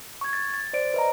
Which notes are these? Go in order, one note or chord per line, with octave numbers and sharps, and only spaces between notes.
C#6 G#6
A6
A6
C5 D5 D7
B4 D#5 A#5